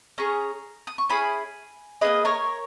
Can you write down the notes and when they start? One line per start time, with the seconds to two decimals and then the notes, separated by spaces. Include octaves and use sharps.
0.18 C#4 G#4 A#5 C#6
0.87 D#6
0.98 C#6
1.10 C#4 E4 G#4 G#5 B5
2.01 A#3 E4 G#4 B4 D#5
2.25 A#4 C#5